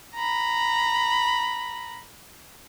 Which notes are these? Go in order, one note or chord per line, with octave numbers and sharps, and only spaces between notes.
A#5 B5